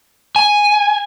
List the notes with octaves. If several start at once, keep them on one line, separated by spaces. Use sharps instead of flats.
G#5